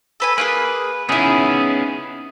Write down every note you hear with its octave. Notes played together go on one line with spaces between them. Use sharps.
A4 B4 G#5
A#3 F4 G#4 B4
B3 C#4 D#4 E4 G#4